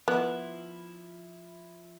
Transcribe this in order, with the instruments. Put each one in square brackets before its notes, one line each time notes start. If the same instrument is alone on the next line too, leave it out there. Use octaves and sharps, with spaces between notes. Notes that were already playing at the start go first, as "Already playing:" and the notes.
[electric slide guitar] F3 E4 [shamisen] B3